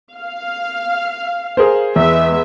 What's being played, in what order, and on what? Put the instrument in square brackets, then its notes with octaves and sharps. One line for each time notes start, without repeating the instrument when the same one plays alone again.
[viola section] F5
[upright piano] G#4 A#4 C5
[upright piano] E2 [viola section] G#3 B3 E5